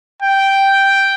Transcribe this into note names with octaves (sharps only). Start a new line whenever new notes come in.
G5